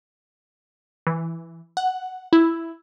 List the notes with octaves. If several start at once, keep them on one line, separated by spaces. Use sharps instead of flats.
E3
F#5
E4